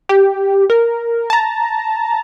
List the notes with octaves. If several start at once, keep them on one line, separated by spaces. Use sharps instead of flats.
G4
A#4
A5 A#5